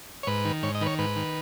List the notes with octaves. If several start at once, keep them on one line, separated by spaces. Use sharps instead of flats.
C#5
G#2 B4
D#3
G#2 C#5
D#5
D#3 B4
C#5
G#2 B4
D#3